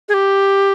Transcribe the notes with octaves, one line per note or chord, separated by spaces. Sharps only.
G#4
G4